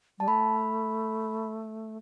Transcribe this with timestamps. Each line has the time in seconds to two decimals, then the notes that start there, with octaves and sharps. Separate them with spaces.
0.19 G3 A5
0.28 A3 B5